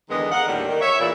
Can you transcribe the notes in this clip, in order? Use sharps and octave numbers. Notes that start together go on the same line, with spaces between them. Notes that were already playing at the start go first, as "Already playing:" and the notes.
E2 D3 D#3 G#3 B3 D#5
A#4 D#5 F5 F#5
D#2 A2 D3 G3
D#3
C#5 E5
E2 A#2 E4